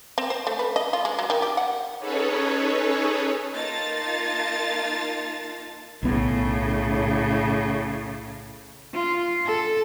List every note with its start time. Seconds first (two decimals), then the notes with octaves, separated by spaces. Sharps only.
0.18 C4
0.30 C5
0.47 A3
0.59 B4
0.76 D#5
0.93 F4
1.05 G#3
1.19 F#3
1.30 D#3
1.42 G4
1.57 F#5
1.99 C#4 D#4 G#4 A4 B4 C#5
3.56 A#3 D#4 F4 A5 A6
6.03 B1 A2 C#3 B3
8.93 F4
9.46 A4